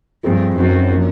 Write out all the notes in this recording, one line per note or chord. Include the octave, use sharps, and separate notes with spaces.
G2 F3 A3 C4 F4 G#4
F#2 A3 C4 D#4 F#4 A#4
F3 A#3 D4